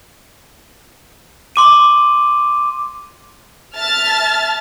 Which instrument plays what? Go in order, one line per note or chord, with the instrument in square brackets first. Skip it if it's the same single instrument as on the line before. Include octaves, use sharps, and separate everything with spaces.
[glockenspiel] C6 D6 D#7
[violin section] E5 A5 F6 A6